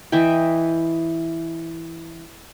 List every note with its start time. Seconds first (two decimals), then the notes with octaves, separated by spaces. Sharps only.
0.12 E3 D#5 E5 G5